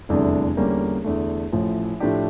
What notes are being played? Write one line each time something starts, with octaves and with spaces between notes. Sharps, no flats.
F1 E2 D3 G3 D4
E2 D3 G3 A#3 C#4
E2 D3 A3
A1 A2 F3
A2 F3 A3 D4 G4